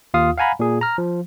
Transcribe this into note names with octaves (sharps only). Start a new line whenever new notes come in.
D#2 F4 F5 D#6
F5 F#5 G#5 A#5 B5
A#2 G#4
A#5 F6
F3